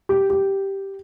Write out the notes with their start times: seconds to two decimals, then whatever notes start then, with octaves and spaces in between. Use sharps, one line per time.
0.09 G4
0.30 G4